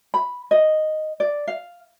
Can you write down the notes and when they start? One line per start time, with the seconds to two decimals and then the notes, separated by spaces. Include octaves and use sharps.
0.14 B5
0.51 D#5
1.20 D5
1.48 F5